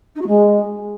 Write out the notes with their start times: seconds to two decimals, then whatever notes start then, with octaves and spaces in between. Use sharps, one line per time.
0.15 D#4
0.21 F#4
0.27 G#3